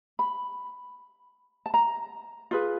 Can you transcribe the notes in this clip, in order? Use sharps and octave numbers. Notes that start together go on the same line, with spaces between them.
B5
A5
A#5
F4 G#4 B4